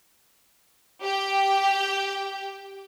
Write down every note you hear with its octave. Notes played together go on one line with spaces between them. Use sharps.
G4 G5